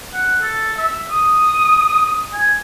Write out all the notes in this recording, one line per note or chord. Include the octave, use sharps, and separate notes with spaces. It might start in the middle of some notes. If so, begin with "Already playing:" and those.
F#5
A4
E5
D#6
G#5